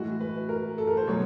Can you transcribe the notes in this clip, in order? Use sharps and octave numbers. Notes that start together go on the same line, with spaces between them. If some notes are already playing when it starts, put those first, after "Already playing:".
Already playing: A2 E3 G#3 F#4
B4
A#4
A4
A#4
C5
B2 F#3 C#5